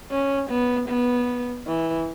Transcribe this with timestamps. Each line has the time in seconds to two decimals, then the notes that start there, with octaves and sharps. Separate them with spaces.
0.11 C#4
0.50 B3
0.89 B3
1.67 E3